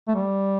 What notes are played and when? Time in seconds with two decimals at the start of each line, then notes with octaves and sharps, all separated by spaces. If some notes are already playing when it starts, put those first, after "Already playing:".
0.08 A3
0.15 G3